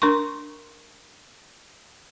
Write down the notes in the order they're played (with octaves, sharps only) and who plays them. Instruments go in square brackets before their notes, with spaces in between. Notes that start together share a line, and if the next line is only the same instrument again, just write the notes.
[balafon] D4 A#4 C6 C#6